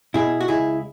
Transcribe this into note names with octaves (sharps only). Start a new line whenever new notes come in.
B2 E4 G#4
F#4
C#2 E4 G#4